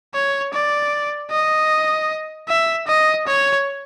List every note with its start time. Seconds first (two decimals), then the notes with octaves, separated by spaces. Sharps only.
0.14 C#5
0.53 D5
1.31 D#5
2.48 E5
2.87 D#5
3.27 C#5